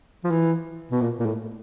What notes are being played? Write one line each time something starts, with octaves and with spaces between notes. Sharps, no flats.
F3
E3
B2
A#2
A#2
A2